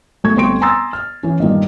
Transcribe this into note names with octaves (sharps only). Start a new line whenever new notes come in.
B1 A3 C#6 G#6
G1 A3 C4 C6 C#6 D7
G#5 A#5 C6 D#6 E6 A6
F6
E3 C#4
G2 A#2 D#3